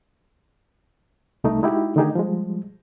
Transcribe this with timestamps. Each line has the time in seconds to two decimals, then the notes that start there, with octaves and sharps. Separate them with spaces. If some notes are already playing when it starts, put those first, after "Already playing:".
1.44 C2 A3 D#4
1.63 G#3 D#4 E4 F#4 G4
1.96 D3 D#3 A3 D#4 G4 G#4
2.15 F3 G3 G#3